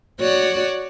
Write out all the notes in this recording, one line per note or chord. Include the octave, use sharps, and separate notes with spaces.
F#4 C#5 D5